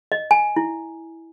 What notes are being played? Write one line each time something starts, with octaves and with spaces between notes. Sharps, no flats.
D#5
G#5
E4